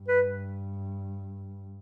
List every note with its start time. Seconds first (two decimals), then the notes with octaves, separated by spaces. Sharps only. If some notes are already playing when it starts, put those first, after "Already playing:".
Already playing: G2
0.08 B4